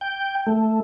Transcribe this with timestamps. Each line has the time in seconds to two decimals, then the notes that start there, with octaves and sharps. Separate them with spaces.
0.01 G5
0.46 A3